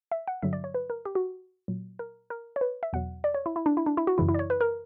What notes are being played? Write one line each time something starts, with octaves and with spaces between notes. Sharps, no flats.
E5
F#5
G2 D3 F#3 E5
D5
C#5
B4
A#4
G4
F#4
A#2 F#3
A#4
A#4
C#5
B4
E5
E2 B2 F#3 F#5
D5
C#5
E4
E4
D4
E4
D4
E4
F#4
F#2 C#3 E3 E4
E4
D5
C#5
B4
A#4